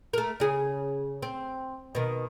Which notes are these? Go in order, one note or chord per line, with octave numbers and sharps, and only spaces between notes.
A3 A#4
C#3 G#4
C4
B2 D#3